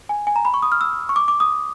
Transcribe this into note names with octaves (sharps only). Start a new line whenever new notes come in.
G#5
G#5
A#5
B5
C#6
D#6
F6
E6
C#6
D6
D6
D#6